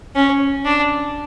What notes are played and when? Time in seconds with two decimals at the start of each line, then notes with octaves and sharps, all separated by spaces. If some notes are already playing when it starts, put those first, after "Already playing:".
0.15 C#4
0.65 D4